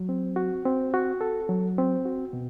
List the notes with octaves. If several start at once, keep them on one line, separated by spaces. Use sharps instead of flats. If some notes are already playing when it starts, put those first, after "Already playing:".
Already playing: F#3
C4
F#4
C4
F#4
A4
F#3
C4
F#4
B2